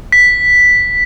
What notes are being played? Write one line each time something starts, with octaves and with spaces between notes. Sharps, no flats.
B6